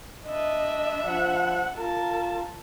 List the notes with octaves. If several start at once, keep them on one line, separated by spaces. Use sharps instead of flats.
D4 D#5 E5
F3 F#5
F4 A#4 A5